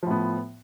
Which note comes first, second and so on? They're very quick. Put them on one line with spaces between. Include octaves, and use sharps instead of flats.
F3 A2 B3